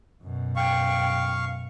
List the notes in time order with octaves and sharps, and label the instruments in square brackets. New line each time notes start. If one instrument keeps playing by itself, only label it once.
[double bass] F#2 B2
[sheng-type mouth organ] F5 C#6 [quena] G5